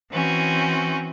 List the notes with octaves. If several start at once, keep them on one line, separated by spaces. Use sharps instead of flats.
E3 C4 C#4 F#4